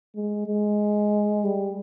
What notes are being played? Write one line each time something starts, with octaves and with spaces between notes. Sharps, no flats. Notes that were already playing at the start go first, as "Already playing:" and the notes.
G#3
G#3
G3